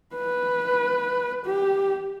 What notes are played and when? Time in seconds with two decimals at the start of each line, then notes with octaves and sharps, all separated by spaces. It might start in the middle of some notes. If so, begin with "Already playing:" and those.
0.15 B4
1.45 G4